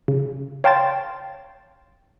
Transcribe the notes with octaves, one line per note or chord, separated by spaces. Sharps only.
C#3
C#5 F5 G5 A5 C6 A6